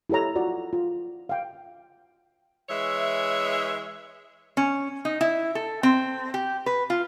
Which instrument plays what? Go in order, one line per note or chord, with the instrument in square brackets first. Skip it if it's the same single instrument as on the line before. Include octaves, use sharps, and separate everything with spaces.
[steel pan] E4 G4 A4 C#5 A#5
F4 F#4 D5
F4
F5 G5
[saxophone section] E3 G#3 C#5 E5
[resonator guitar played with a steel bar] C#4
D#4
E4
A4
C4
G4
B4
F4